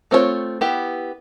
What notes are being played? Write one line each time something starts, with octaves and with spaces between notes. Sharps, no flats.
A3 C4 F4 G#4 C#5
B3 E4 G4